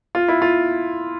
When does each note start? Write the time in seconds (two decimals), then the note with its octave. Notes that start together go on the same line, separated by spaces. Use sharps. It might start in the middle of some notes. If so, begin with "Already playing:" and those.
0.15 F4
0.28 E4
0.42 F4